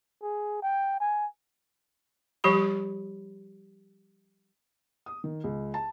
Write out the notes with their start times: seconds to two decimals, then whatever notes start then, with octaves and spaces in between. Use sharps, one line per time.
0.22 G#4
0.62 G5
1.00 G#5
2.44 F3 G3 G4 B5
5.06 D#6
5.24 D#3
5.44 C#2
5.74 A5